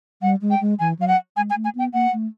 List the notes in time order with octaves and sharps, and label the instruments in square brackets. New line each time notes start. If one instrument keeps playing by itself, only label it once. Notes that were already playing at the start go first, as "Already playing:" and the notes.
[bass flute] G3 [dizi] F#5
[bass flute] G#3
[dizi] G5
[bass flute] G#3
[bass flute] E3 [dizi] G#5
[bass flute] F#3 [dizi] F5
[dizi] F#5
[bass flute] G#3 [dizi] G#5
[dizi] G#5
[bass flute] A3
[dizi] G#5
[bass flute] B3 [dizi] G5
[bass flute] A#3 [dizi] F#5
[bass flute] A3